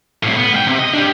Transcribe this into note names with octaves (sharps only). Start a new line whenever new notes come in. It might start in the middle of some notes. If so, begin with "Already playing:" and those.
C2 A2
B3
G#2 G5
C3
D#5
D4 G4